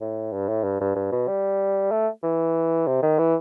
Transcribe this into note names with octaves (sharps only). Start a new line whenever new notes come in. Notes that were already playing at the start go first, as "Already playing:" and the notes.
A2
G2
A2
G2
G2
G2
B2
G3
A3
E3
C3
D#3
E3